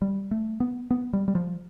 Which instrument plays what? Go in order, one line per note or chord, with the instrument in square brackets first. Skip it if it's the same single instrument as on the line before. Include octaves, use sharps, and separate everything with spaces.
[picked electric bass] G3
A3
B3
B3
G3
G3
F3